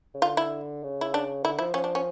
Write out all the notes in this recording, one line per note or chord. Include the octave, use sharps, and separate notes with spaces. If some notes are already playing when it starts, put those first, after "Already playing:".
C#3
D3 F4
E4
C#3
E4
D4
D3 E4
F3 E4
F3 C#4
D4
C#4